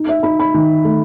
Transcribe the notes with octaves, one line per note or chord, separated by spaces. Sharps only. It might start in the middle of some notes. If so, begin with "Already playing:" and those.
Already playing: D#4
E5
D#4 B5
B5
D#3
A3